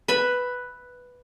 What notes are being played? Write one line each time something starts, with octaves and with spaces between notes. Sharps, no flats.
B4 E5 B5